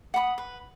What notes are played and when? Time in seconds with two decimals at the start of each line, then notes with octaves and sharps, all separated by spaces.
0.14 F#5 B5 D#6
0.38 B4